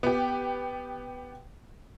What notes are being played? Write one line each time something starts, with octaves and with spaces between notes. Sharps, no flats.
B3 G4